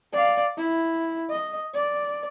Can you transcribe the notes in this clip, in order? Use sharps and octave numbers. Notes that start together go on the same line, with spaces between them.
D5 F5
E4
D#5
D5